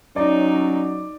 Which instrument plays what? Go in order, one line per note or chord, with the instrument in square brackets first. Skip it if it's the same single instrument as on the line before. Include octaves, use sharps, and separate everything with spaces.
[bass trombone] F#3 [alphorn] C#4 [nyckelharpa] D#4 [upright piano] D5